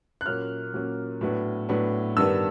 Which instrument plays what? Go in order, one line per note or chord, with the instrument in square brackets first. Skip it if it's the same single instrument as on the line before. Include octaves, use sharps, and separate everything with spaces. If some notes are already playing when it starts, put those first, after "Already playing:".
[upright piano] F#6
A#2 F#3 A#3 C#4 F6
A#2 F#3 A#3 C#4
A2 F#3 B3 D4
A2 F#3 B3 D4
G2 D#3 G3 B3 D4 E6